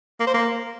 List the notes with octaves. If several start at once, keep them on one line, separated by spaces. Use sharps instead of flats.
A#3
C5
A#3